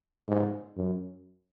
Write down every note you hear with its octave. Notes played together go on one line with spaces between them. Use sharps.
G#2
F#2